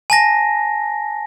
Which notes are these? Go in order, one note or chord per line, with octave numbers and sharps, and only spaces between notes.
G#5 A5 A#6